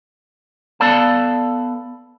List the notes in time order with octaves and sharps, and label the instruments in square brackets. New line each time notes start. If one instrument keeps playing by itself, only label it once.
[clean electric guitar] B3 A4 D5 F5 A5